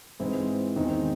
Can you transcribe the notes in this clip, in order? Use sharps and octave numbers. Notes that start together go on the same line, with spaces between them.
G#2 E3 G#3 C4 E4
E2 D#3 G#3 C4 D#4